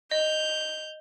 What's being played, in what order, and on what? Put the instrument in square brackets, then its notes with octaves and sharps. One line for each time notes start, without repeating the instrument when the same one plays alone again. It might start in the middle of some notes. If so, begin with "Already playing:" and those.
[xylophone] D#5 [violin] G6 F7